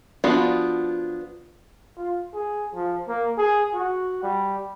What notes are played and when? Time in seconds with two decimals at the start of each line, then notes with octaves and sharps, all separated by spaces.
0.24 F3 B3 D4 F4 F#4
1.97 F4
2.35 G#4
2.74 F3
3.08 A#3
3.38 G#4
3.74 F#4
4.23 G3